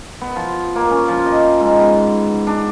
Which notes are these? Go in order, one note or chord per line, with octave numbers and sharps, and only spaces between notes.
B3
F3
A#3
C#4
F3
D#5
G#2
B3
D4